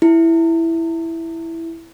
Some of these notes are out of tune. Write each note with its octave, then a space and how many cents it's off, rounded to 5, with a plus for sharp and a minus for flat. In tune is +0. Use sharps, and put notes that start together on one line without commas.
E4 +0